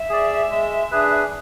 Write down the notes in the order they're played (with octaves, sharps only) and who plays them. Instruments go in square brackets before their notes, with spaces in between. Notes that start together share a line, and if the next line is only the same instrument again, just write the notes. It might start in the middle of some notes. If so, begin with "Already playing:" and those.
Already playing: [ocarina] E5
[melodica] G#4 D5
G#3
D4 G#4 B4